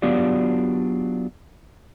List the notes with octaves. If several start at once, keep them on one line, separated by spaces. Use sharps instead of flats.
F#3 B3 D4 F4 G4 D5